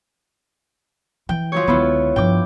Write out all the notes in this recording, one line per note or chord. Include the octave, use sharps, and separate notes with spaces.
E3 G5
F3 F#3 C#5
C#2 D3 B3 E4 F4
G2 F3 G5 D6